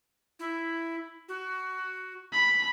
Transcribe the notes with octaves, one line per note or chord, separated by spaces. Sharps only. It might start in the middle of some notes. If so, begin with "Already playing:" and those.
E4
F#4
B5